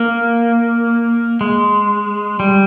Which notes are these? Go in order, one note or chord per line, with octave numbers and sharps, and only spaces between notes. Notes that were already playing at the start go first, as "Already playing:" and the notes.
Already playing: A#3
G#3
G3